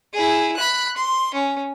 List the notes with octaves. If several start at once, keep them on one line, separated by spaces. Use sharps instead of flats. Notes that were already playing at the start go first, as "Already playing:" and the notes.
E4 G#4
B5 F#6
C6
C#4